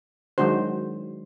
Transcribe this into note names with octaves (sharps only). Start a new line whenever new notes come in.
D#3 F#3 G#3 D4 F#4 C5